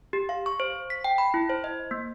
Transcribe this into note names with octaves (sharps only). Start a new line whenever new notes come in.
G4
F5
C#6
C5
B6
G5
B5
E4
C5
D#5
A#3